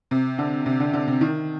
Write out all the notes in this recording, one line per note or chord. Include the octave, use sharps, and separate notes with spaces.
C3
D3
C3
D3
D3
C3
D#3